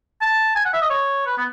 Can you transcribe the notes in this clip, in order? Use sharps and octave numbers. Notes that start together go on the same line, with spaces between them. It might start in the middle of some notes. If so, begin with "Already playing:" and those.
A5
G#5
F#5
E5
D#5
C#5
B4
B3